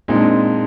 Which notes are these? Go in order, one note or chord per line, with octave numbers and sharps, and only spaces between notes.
A#2 G#3 C4 D#4
D4
C4